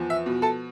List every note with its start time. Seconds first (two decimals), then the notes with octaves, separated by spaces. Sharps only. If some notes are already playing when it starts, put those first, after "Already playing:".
Already playing: E2 F3
0.10 E5
0.26 B2
0.42 A4 A5